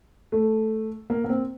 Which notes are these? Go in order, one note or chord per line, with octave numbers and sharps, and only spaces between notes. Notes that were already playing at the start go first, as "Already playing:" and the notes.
A3
A#3
A#3
C4